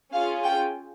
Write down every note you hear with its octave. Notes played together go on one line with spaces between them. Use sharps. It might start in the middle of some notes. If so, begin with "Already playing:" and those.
C#4 F4 G#4 F5
G5